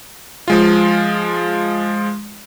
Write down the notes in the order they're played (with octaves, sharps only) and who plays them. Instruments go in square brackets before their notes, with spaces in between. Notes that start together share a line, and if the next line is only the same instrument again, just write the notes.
[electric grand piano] F3 G#3 F4